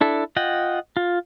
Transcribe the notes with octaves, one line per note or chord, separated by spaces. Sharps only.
D4 E4 A4
F4 D#5 F#5 G5
F4